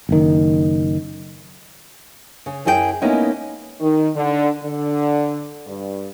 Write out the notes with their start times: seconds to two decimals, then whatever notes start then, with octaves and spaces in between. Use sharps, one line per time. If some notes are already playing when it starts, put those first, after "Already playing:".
0.09 F#1 D#3
2.46 C#3
2.65 F#2 C#4 E4 G#4 A4 G5
3.02 G#3 A#3 B3 C#4 D#4 E4
3.81 D#3
4.15 D3
4.63 D3
5.67 G2